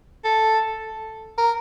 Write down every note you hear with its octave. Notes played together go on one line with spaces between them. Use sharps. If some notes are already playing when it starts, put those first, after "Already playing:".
A4
A#4